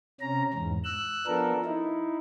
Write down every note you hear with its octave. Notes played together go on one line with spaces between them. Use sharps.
C3 C#4 A#5
E2 G#2
E6 F#6
F3 B3 D4 A4 A#4
D#4 E4